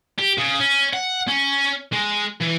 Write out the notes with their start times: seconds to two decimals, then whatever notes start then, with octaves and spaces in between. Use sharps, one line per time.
0.19 G4
0.38 C#3
0.60 C#4
0.93 F#5
1.28 C#4
1.93 G#3
2.41 E3